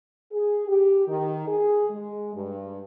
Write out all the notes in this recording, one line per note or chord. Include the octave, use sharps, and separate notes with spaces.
G#4
G4
D#3
G#4
G#3
G2